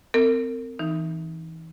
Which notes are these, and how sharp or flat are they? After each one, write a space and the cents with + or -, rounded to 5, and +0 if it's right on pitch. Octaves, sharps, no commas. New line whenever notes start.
C4 -25 A#4 -35
E3 -15 D#4 +0